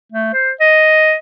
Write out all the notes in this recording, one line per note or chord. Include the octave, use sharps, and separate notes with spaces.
A3
C5
D#5